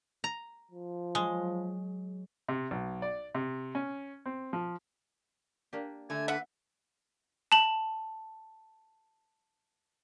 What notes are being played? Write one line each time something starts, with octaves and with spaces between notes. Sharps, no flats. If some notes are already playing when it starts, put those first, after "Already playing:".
A#5
F3
F#3 G#3
C3
B1
D5
C3
C#4
C4
F3
A#3 D4 G4
D3 A3 G#5
B4 E5 F#5
A5 F#7